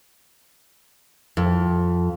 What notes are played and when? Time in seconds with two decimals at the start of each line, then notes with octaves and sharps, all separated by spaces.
1.37 F2